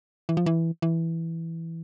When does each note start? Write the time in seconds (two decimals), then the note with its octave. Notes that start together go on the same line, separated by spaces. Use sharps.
0.29 E3
0.37 F3
0.46 E3
0.82 E3